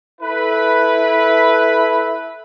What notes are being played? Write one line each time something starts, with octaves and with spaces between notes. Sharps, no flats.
E4 A4 B4